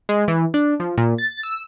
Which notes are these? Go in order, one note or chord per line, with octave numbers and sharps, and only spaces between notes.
G#3
E3
D4
F3
A#2
A6
E6